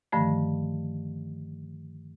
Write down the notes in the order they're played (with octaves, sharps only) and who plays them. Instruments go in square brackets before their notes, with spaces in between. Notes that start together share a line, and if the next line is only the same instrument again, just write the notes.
[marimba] G2 D3 D#3 F3 A3